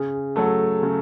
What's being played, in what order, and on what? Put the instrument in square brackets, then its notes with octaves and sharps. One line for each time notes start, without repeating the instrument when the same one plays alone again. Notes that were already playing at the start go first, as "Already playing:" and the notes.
Already playing: [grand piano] C#3 [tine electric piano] G#4
[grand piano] F#3 A3 [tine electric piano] A4
[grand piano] C#3